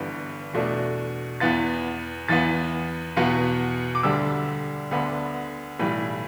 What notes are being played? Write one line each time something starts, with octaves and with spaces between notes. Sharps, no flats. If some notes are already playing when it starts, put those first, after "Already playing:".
Already playing: G1 G2 E3 G3 B3
E2 B2 A3 D4
E2 E3 B3 A6
E2 E3 B3 A6
E2 B2 B3
D6
D2 D3 G3 E6
D2 D3 B3 D4 B5
B1 A2 E3 G3 B5